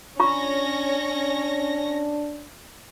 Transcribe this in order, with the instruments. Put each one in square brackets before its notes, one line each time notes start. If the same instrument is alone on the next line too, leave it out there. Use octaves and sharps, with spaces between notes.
[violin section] C#4 C#5 A#6 [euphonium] D4 [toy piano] F4 A#5 C#6